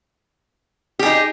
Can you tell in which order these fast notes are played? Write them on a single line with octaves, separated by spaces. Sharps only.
G4 G#4 D#4